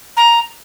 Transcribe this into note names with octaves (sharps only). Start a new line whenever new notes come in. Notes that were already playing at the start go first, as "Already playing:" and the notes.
A#5